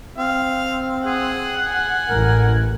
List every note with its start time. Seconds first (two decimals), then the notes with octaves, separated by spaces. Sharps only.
0.18 C4 F5
1.05 G#4 F#5
1.66 G#5
2.09 A1 A#4